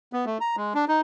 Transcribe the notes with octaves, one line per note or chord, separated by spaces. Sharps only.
B3
A3
A#5
G#3
D4
D#4